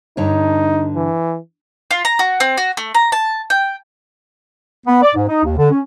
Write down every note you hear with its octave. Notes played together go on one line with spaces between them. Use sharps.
G2 D3 D#4 C#5
E3
F4
A#5
F#4
C4
F#4
A3
A#5
A5
G5
B3
D5
G#2
D#4
D#2
D3
C#4